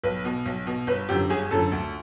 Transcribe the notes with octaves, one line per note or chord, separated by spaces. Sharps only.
B1 B4
B2
B1
B2
G1 B4
F#2 D3 F3 G4
G1 G#4
F#2 D3 F3 A4
D2